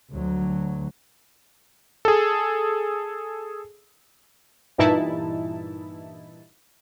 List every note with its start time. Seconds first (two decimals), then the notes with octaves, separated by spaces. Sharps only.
0.11 D2 F#3
2.05 G#4 A4
4.78 G2 A#2 E3 D#4 E4 A5